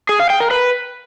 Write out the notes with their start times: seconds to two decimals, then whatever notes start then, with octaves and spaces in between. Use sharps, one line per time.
0.09 G#4
0.20 F5
0.30 G5
0.40 A#4
0.51 B4